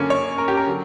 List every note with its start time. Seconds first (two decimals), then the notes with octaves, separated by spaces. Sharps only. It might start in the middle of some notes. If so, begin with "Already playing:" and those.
Already playing: F#2 D3 A#3 C#4
0.10 C#5
0.38 A#4
0.48 G4
0.57 A#4
0.67 D3 F#3